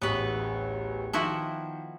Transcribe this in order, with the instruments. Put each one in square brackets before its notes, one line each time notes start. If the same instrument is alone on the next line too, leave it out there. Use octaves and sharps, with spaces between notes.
[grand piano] D1 A1 C#6 [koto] B3 B4
[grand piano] D#3 [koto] F3 E4 F#4